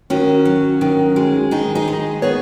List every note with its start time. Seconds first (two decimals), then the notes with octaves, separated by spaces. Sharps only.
0.10 D#3 C#4 F#4
0.45 F#3
0.81 D#3
1.16 G#3
1.51 D#3 D#4 G#4
1.75 D#4 G#4
1.88 G#3
2.22 B3 G#4 C#5